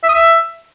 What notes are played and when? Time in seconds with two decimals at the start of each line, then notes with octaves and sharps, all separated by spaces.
0.03 E5
0.08 D#6
0.14 E5